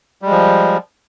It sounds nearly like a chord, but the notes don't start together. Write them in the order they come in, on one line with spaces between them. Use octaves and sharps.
G3 G#3 F3